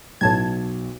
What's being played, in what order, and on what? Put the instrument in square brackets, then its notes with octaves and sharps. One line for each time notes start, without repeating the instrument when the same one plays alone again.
[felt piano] B1 [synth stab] A2 A5 G#6